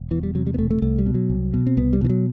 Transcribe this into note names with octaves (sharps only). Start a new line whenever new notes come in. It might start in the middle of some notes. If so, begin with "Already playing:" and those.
Already playing: E1
E2 E3
G3
C3 F#3
G3
B3
E1 A3
A3
C2 A3
G3
B2
F#3
C2
B2
C4
C2 B3
G3
B2 E3
F#3